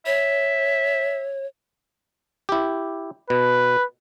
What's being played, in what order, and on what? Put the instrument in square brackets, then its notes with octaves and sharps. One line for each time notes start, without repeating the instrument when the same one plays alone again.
[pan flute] C#5 [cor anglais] E5
[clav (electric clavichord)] E4 G4
[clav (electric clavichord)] B2 [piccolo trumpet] B4